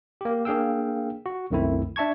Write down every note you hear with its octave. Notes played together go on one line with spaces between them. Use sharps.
A#3 G4
A#3 D4 G#4 F5 G5 E6
F#4
C2 F#2 D#3 A3 C4 E4
D4 E5 A5 C#6 G#6